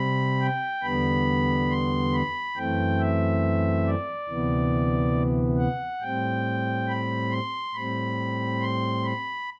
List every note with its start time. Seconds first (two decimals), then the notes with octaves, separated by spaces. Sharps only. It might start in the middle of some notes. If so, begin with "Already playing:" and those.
Already playing: C3 G3 C4 B5
0.41 G5
0.83 E2 D3 G3 B3 B5
1.71 C6
2.14 B5
2.57 F#2 E3 A3 C4 G5
2.99 E5
3.87 D5
4.29 D2 C3 E3 B3
5.58 F#5
6.02 A2 G3 C4 G5
6.88 B5
7.31 C6
7.75 A2 G3 C4 B5
8.61 C6
9.05 B5